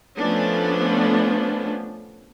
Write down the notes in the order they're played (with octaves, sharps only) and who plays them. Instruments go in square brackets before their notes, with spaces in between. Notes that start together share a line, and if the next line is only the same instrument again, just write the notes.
[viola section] F3 A3 B3 C#4 D4